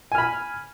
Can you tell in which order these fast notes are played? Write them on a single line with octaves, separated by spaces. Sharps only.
G#5 F6 B5